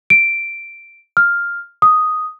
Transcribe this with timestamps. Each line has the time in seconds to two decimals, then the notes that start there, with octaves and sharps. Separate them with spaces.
0.10 D7
1.17 F6
1.82 D#6